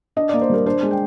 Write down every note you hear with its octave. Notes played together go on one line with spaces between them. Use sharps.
D4 D#5
A#3 D5
C5
G3 A#4
D4 C5
G#3
G5